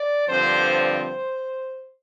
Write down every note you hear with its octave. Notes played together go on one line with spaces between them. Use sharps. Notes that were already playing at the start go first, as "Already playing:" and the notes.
Already playing: D5
G2 D3 F3 C4 C5
C5